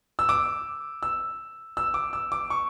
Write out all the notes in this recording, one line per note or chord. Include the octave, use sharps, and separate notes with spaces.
E6
D6
E6
E6
D6
E6
D6
C#6